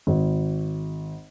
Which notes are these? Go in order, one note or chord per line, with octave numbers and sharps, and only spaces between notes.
G#1